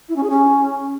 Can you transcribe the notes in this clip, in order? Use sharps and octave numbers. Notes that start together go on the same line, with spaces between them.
E4
C#4
G#4
C#4